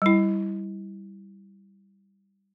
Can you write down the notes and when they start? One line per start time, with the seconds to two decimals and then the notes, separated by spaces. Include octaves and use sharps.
0.02 G3 E4